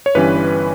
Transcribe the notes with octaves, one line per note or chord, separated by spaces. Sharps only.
C#5
G1 G2 E3 G3 C#4 B4